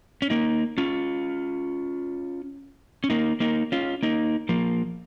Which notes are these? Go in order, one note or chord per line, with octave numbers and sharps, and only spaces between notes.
C#4
A#3 D#4
C#4 F4
C#4
A#3 D#4
A#3 D#4
C#4 F4
A#3 D#4
F3 A#3